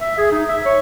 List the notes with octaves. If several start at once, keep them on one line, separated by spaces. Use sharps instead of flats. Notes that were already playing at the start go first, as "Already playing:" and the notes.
E5
G#4
D#4
E5
C#5